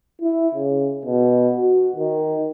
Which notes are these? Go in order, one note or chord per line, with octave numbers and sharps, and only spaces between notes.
E4
C#3
B2
F#4
D#3